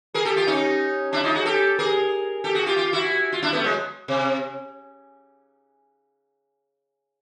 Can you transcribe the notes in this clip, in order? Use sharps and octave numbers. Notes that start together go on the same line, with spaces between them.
G#4 A#4
G4 A4
F4 G4
C#4 D#4
D4 E4
D#4 F4
F#4 G#4
G4 A4
G#4 A#4
G4 A4
F#4 G#4
F4 G4
F4 G4
E4 F#4
F4
D4 E4
A3 B3
F#3 G#3
C3